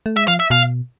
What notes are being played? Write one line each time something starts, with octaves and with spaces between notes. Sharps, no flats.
A3
G#3 E5
F3 F5
E5
B2 F5